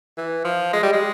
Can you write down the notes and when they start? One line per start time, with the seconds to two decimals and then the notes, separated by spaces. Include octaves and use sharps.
0.18 E3
0.44 F3
0.73 G#3
0.83 G3
0.93 G#3